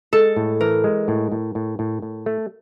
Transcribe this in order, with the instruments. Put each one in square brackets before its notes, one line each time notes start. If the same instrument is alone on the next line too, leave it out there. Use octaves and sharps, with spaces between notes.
[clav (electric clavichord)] G#3 [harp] A4
[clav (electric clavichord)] A2
[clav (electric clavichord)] E3 [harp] A#4
[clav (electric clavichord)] G#3
A2
A2
A2
A2
A2
A3